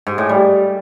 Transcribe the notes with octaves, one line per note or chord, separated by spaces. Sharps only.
G#2
A2
G3